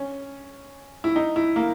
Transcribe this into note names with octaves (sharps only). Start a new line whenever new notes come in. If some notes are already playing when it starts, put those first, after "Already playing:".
Already playing: C#4
E4
D#4
E4
A#3